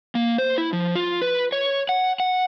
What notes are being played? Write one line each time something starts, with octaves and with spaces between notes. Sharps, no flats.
A#3
C5
E4
F3
F4
B4
C#5
F#5
F#5